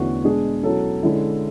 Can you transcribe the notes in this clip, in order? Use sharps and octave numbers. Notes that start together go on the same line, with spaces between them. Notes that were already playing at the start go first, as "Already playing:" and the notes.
Already playing: E2 D3 A3 C#4 E4 F#4
B2 G#3 D4 G#4
B2 F#3 C#4 E4 A4
D3 G#3 C#4 E4